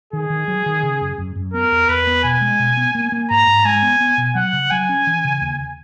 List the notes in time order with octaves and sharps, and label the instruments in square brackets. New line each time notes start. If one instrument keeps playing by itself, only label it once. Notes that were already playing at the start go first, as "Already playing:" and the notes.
[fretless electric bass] D#3 [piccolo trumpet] G#4
[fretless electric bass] D#3
F#3
D#3
C#3
F#2
F#2
F#2
[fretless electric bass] B3 [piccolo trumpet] A#4
[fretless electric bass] E2
[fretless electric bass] E2 [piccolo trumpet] B4
[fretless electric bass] B3
[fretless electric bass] B2 [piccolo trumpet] G#5
[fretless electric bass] G#3
B2
B3
A#3
A#3
[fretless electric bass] G#2 [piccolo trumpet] A#5
[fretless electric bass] G#2
[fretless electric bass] G#3 [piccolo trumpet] G#5
[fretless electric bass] B3
B3
B2
[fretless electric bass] F#3 [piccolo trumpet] F#5
[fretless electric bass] C#3
[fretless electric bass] F#3 [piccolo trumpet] G#5
[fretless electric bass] C#4
E3
C#3
D#2